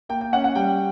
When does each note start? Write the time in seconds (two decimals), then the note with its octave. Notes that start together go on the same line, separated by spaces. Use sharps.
0.09 A#3 G5
0.21 G5
0.33 C#4 F#5
0.44 F#5
0.55 G3 G5